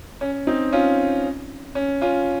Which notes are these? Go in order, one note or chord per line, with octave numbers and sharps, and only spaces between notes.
C#4
C4 D#4
C#4 F4
C#4
C#4 F4